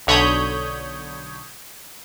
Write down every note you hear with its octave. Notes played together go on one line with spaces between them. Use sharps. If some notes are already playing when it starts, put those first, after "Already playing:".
B1 D3 C#5 B5 D#6 G6